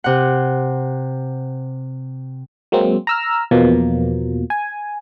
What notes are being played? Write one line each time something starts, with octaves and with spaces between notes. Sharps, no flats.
C3 F#5
F#3 G#3 A#3 C4
A#5 E6 F6
E2 B2 F3 A#3
G#5